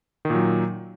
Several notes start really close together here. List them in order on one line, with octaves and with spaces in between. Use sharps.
D#3 A#2 F#3